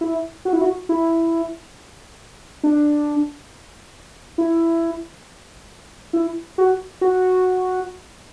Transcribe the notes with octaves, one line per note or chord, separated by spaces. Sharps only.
E4
F#4
E4
F#4
E4
D4
E4
E4
F#4
F#4